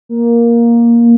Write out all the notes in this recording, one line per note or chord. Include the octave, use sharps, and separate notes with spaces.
A#3